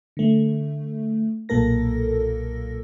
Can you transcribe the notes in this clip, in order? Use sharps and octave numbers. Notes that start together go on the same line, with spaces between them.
D3 A3
B1 A#2 A#3 A4 A#4 A#6